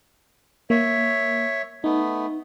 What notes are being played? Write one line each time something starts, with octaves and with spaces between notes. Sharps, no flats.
A#3 C#5 E5
A3 B3 D#4